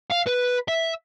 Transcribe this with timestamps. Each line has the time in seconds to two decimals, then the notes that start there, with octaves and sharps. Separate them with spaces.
0.10 F5
0.27 B4
0.68 E5